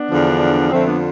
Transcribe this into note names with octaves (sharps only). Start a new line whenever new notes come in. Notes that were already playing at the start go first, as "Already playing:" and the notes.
Already playing: B3 D4
E2 D3 F3
F2 D3 F3 A3 C4
B3 D4